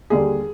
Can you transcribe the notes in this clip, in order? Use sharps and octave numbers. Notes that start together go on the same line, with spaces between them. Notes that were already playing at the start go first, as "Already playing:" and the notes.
D#2 D3 G3 G#4